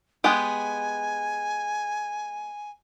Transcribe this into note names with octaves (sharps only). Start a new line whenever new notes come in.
G#3 B3 G4 G#5